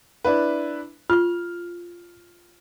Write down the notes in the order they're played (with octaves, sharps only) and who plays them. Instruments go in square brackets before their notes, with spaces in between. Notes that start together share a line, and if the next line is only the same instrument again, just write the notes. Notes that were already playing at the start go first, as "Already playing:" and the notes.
[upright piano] D4 E4 B4
[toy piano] F4 C#6 [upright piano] F6